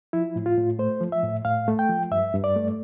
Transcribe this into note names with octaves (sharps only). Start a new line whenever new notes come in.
F3 E4
A2
F4
A2
A3 C5
F3
E5
A2
A2 F5
A3
G5
F3
G2 E5
G2
D5
A3